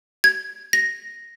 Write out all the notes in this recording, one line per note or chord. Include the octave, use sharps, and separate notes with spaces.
G#6
A#6